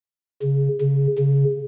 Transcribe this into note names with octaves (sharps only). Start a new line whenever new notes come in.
C#3
C#3
C#3